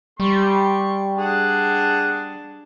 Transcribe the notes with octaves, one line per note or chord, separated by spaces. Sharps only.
G3 G4 C6 C#6
D4 G#4 F#5 A5